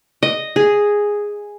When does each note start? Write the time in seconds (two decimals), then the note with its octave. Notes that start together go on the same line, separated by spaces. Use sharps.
0.23 D#5
0.56 G#4